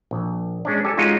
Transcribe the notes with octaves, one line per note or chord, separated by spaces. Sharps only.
A#1
G#3 C#4 D4
G4 A4 G#5
G#3 C#4 D#4 F4 F#4